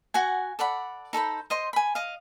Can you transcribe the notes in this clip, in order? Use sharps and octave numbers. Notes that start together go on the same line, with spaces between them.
F#4 F#5 G#5
A4 D5 F#5 B5
D#4 A4 C5 B5
C5 D#5 C6
G#5 B5
D#5 F5